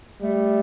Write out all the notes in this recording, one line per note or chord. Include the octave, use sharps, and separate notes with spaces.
G3 A3